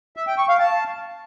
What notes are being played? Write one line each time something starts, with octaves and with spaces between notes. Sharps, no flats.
E5
G5
C#6
F5
A5